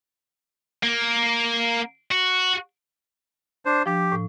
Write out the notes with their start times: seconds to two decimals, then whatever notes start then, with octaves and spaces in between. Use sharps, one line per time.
0.83 A#3
2.11 F#4
3.65 D4 C5
3.86 F3 D4 G4
4.12 A2